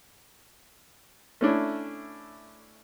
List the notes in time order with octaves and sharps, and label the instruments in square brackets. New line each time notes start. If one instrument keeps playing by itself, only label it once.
[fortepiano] A3 C#4 D4 E4